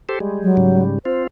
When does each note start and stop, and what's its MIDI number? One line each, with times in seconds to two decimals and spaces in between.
0.09 0.19 67
0.09 0.19 69
0.09 0.19 72
0.20 0.56 55
0.20 0.56 56
0.43 0.83 54
0.57 0.99 44
0.57 0.99 49
0.57 0.99 55
1.05 1.27 60
1.05 1.27 65
1.05 1.23 72